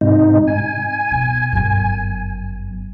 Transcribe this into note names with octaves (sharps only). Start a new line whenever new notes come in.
G#2 C3 D#4
G#5
B2
G1 F#2